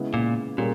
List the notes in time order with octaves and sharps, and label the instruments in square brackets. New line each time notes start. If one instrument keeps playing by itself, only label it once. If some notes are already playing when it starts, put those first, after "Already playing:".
Already playing: [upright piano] C#3 G#3 B3 E4
[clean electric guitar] A#2
[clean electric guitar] A#2 [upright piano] G3 A#3 C#4 G#4